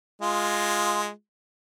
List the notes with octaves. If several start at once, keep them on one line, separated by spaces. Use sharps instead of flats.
G#3 F4